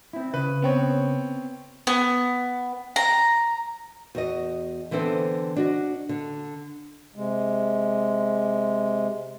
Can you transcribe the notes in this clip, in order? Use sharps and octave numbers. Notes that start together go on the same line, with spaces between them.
C4 E4
C#3 B4
B3 C4 C#5
B3
A#5
E2 F#4 D#5
D3 E3 B3 C4 A4 C5
D4 F#4 D#5
D3
C3 G#3